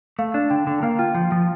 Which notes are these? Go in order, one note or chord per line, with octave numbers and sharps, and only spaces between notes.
A3 F5
D4
D3 G5
D3
A#3 F5
F4 G5
F3 F5
F3 F5